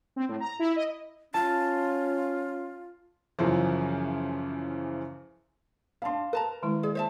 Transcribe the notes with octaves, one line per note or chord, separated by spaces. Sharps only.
C4
A2
A#5
E4
D#5
C#4 F4 A5
F#2 C#3 E3 F3
C#4 D4 F5 A5 C6
A#4 B4 A5 A#5
D#3 G#3 E4
G#4 D5
C5 E5 A5